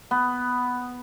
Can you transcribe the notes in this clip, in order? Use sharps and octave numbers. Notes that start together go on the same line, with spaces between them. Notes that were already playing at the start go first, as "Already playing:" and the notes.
B3